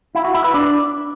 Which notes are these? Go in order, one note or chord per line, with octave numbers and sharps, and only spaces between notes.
E4
F#4
E4
B4
D4